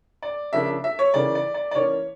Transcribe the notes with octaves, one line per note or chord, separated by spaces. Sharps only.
D5
C#3 F3 A#3 D4 E5
E5
C#5
C#3 E3 A#3 D5
D5
D5
D5
E3 A#3 C#4 C#5